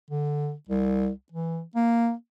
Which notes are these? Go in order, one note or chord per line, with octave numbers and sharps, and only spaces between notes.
D3
C2
E3
A#3